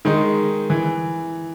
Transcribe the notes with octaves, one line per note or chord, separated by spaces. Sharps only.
D#3 G#3 D#4
E3